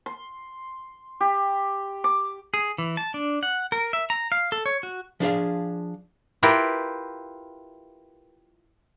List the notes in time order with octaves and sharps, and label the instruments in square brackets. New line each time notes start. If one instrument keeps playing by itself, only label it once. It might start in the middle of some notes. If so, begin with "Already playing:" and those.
[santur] C6
G4
D6
[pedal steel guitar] G#4
E3
A5
D4
F#5
A#4
E5
A#5
F5
A4
C#5
F#4
[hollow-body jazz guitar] F3 D4 G#4 F5
[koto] E4 F4 G4 A#4 B4